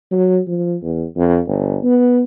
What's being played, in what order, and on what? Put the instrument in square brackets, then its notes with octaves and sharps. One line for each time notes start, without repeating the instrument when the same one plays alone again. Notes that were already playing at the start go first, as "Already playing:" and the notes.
[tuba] F#3
F3
E2
F2
G1
B3